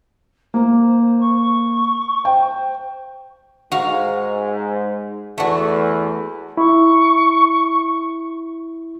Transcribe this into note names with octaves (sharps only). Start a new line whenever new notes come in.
A#3 C5
C#6
C5 G5
G#2 F#4 F5
E2 A3 F#4
E4 C#6